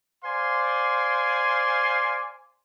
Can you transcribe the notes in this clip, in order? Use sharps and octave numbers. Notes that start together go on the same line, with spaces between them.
C5 D5 F5 G#5 C6